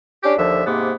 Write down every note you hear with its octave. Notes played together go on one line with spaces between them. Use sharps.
C#4 D4 G4
D#2 D3 F3 E5
G#2 C3 A#3 B3